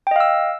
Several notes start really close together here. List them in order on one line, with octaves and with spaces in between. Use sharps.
G5 D#5 F5 E6